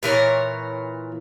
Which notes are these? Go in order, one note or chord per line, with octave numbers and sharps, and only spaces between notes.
A#2 E3 A#4 C#5